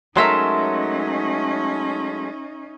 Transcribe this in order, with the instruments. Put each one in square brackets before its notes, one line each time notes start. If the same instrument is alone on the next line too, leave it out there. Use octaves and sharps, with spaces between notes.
[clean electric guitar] F#3 G#3 A3 [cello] C#4 D#4 [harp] A#4 E5 C6